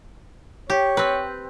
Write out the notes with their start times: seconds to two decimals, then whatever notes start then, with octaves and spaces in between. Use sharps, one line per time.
0.70 G4 C#5
0.97 C4 B4